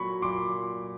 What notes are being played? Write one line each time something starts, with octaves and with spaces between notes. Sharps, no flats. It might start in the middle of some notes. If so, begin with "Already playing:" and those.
Already playing: A#2 F#3 B5 C#6
A#2 F#3 C6 D6